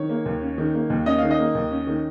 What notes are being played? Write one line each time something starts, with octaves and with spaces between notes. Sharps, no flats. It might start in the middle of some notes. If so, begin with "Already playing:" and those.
Already playing: D#3 C#5
A#3
D#2
C#4
D#3
A#3
D#2
C#4 D#5
D#3 F5
D#5
A#3
D#2
C#4
D#3